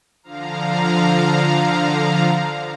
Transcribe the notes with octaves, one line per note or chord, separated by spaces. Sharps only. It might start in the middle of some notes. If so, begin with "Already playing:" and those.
D3 F3 F5 A#5